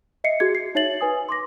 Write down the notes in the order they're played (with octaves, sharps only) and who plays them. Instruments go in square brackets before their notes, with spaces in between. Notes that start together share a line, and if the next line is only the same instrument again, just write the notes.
[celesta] D#5 E5 C7 C#7
F#4 G#4 G#6
C7
D#4 C#5 E5 A6 F#7
B4 G#5 D#6
C6 D6 A#6